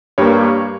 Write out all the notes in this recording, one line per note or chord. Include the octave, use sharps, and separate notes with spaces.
G2 G3 A#3 C#5